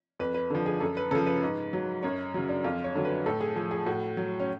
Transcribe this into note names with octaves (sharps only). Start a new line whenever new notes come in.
F2 B4
B4
D3 F3
G#4
F#2 A4
B4
C#3 F3 A4
B4
G#2
F#3
F#2 C#5
C#3 F#3
D4
F2 F4
C#5
D3 F#3
B4
A2 A4
G#4
F3 G#4
G#4
A2 F#4
F#3
C#4